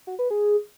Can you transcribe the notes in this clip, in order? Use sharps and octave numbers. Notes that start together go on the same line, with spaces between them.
F#4
B4
G#4